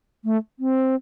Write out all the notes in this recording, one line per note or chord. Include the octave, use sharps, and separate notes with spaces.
A3
C4